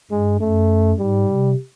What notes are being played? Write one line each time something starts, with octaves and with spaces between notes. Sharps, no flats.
G2 G#3
F#2 A3
G#2 G3
C3